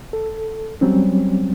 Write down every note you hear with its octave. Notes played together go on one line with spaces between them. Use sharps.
A4
F#3 G3 C4 C#4